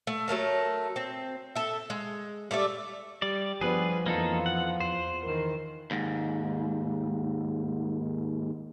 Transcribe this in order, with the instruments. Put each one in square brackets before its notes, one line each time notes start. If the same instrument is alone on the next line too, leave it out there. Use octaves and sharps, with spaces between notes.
[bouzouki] A3
F#3 A3 A#4 A5
C4
A4 E5
G#3
G3 A3 D5 E5
[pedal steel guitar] G3 D5 [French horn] G4
[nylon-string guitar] F3 B3 D4 [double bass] G3 [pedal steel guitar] G#4 B4
[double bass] F2 E3 [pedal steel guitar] A#3 D#4 A4 [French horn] F4
[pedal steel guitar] F#5
[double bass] E2 [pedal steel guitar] C5
[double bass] D#3 E3 [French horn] A#4
[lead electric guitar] D#2 G#2